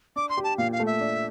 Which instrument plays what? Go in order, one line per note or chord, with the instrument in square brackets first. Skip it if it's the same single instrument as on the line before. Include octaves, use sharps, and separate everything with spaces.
[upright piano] D4 [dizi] D6
[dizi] C6
[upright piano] G4
[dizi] A5
[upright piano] A#2 [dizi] F5
[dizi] F5
[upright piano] A3
[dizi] E5
[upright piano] D4